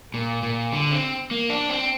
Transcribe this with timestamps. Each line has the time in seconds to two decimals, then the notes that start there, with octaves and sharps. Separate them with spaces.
0.14 A#2
0.43 A#2
0.73 D3
0.91 C4
1.31 A#3
1.50 D4
1.69 C4